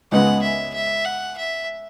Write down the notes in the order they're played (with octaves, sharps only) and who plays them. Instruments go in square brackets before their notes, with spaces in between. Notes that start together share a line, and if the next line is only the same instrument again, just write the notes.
[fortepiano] C#2 C#3 G#3 B3 [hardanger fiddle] F#5
[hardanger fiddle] E5
E5
F#5
E5